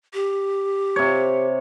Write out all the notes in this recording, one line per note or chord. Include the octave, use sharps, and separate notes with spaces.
G4
C3 C#5